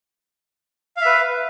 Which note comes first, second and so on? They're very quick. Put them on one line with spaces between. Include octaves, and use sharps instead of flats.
F5 E5 B4